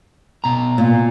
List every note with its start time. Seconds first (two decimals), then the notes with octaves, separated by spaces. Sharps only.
0.44 B2 A#5
0.78 A#2